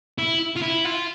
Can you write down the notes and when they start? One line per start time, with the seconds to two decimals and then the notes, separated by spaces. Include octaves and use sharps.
0.18 E4
0.56 F4
0.62 E4
0.85 F4